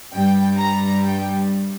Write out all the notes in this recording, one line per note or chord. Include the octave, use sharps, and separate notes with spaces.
G2 G3 G5
A#5
G5